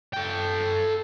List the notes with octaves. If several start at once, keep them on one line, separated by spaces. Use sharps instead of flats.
A4 G5